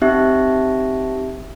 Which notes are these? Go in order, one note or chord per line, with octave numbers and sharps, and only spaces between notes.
C4 D#4 G4 E5